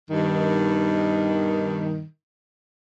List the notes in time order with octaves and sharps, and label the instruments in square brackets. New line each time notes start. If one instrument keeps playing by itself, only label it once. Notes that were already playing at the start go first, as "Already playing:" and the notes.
[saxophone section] G2 B2 D#3